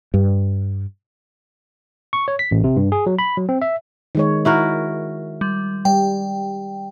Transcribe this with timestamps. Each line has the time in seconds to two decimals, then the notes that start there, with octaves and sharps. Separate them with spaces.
0.14 G2
2.13 C#6
2.28 C#5
2.39 B6
2.51 A1
2.64 C3
2.77 G2
2.92 G#4
3.06 F#3
3.19 B5
3.37 F#3
3.49 C4
3.62 E5
4.15 D#3 G#3 C#5
4.45 E4 F#4 A#4
5.41 G3
5.85 G3 G5